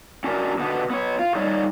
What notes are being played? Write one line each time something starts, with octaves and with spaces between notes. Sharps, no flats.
C#4 D4 F#4 A#4 D5
B2 D3 B3
B3 C#5
F4
G3 D#4 C#5 D5